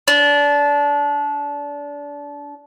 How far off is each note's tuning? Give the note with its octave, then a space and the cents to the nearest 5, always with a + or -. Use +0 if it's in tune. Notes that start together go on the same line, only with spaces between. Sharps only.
D4 -25